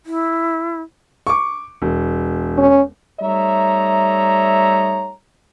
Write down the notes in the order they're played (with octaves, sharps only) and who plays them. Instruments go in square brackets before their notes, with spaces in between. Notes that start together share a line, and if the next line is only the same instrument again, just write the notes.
[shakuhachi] E4
[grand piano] C#6 D6
E1
[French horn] C#4
[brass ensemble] G3 A3 D#4 C#5 E5 A#5